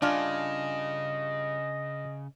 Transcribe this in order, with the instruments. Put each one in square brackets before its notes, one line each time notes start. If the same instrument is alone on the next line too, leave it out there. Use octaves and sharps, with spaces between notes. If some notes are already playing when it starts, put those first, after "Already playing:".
[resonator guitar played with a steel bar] G2 F4 G#5 [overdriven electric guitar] C#3 [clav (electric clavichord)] D4 [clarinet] D#5